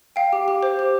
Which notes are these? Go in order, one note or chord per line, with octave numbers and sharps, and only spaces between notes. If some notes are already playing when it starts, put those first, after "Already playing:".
F5 G5
G4
G4
C5
G4